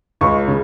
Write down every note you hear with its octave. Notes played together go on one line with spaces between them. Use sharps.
C#2 C#6
C#3